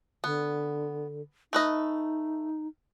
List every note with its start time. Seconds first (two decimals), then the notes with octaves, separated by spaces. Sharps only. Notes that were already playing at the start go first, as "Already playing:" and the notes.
0.24 D3 B3
1.53 A3 D#4 B4 D#5